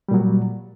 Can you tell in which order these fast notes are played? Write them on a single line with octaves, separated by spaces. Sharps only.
G3 A#2 F#3